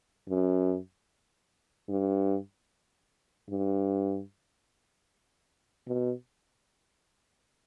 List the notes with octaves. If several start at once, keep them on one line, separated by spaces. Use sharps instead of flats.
F#2
G2
G2
B2